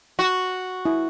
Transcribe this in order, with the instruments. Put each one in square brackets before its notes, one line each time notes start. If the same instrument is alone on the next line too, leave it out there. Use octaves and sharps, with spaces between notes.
[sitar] F#4
[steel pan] E4